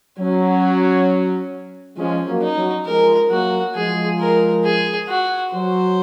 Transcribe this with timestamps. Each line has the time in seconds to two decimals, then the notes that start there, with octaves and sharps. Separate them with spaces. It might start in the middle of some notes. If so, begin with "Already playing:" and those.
0.19 F#3 C#4
1.97 F3 G#3 C#4
2.27 F#3 A#3
2.42 D#4
2.57 F#3
2.86 F3 G#3 A#4
3.31 F#3 A#3 F#4
3.75 F3 G#3 G#4
4.20 A#4
4.64 G#4
5.09 F#4
5.53 F#3 C5